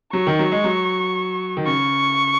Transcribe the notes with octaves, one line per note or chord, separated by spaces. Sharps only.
F#3 C#6
D#3
F#3
G#3
F#3
D#3
C#3 C#6